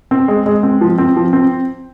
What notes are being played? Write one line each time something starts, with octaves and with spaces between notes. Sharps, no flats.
C4
G#3
G#3
C4
F3
C4
F3
C4